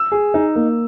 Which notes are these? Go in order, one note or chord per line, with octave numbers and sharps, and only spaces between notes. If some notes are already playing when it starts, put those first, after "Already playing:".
Already playing: E6
G#4
D#4
A#3